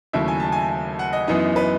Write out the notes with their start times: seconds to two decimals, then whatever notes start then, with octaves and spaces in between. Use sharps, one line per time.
0.13 D#2 C#3 F#3 A3 E4 E5
0.28 G#5
0.40 A5
0.52 G#5
0.99 F#5
1.13 D#5
1.28 F#2 E3 B3 D#4
1.56 B4